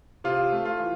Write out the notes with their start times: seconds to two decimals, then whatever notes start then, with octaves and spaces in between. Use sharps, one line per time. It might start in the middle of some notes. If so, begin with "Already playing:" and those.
0.24 C3 F4
0.52 A3
0.65 F4
0.79 E3